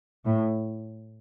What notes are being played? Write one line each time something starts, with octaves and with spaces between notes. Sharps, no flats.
A2